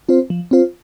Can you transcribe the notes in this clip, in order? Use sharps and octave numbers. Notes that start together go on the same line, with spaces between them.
C4 F4 C5
F3
C4 F4 C5